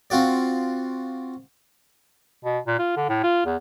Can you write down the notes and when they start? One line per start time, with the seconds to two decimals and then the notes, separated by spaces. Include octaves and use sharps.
0.10 C4 F4 F#4 D5
2.45 B2
2.67 A#2
2.79 F4
2.97 D3
3.09 A2
3.23 F4
3.46 E2